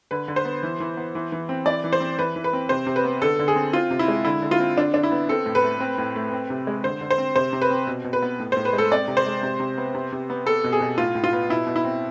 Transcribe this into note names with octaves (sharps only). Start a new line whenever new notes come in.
D3 B4
D3
C5
B3
E3
E3
B3
E3
E3
C4
E3 D5
E3
C5
C4
E3 B4
E3
B4
C4
C3 C5
C3
B4
B3
D3 A4
D3
G#4
C4
C4 F4
C3
E4
G#3
D3 E4
D3
F4
C4
D3 D4
D3 D4
E4
B3
C4 A4
A2
B4
A3
C4
A2
A3
C4
C3
G#3
D3 C5
D3
C5
C4
C3 C5
C3
B4
C4
B2
B2
B4
B3
A2
C5
A2
B4
G#3
A4
C4 D5
C3
C5
G#3
C3
C3
B3
C3
C3
B3
B3 A4
B2
G#4
B2
A2 F4
A2
F4
B3
B2 E4
B2
E4
C4